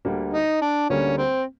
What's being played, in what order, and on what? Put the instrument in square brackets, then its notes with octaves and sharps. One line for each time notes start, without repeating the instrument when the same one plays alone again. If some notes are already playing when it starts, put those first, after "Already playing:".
[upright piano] D2 D3 G3 A#3
[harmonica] D#4
D4
[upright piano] D2 D3 G3 A#3 [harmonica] C#4
[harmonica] C4